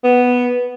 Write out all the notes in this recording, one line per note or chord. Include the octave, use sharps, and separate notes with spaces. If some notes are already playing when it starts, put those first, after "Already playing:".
B3